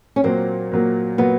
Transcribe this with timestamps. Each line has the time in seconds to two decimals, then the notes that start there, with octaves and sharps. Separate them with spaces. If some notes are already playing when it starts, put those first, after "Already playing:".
0.16 C#4
0.24 A#2 F#3 A#3 C4
0.71 A#2 F#3 A#3
1.18 A#2 F#3 A#3 B3